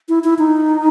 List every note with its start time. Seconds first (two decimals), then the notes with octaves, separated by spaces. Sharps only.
0.09 E4
0.24 E4
0.39 D#4